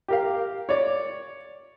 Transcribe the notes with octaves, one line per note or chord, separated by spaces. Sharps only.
G4 A#4 F5
C#5 D5